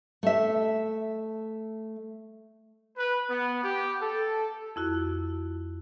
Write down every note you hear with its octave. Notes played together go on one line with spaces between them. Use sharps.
A3 E5
B4
B3
G4
A4
F2 E4 F#4